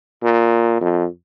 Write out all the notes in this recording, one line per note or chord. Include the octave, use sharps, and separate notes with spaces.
A#2
F2